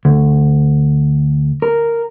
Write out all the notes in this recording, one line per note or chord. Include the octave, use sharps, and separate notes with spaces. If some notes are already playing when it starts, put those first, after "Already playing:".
D2
A#4